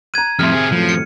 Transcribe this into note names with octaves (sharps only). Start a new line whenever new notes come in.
A#5 F#6 G#6 D#7
F2 A2 C3 E5 C6 F6
C4 G#4
F#2 A2 C3 F3
C#7